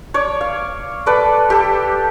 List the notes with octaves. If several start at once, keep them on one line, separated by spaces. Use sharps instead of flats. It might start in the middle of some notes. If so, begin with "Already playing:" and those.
C#5 D5
F5
A4 B4 D5
G4 A4